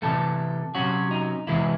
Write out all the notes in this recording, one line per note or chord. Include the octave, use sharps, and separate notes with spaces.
C3 E3 A3 A4
C3 F#3 C#4 F#4
D#4
E2 C3 E3 G#3 E4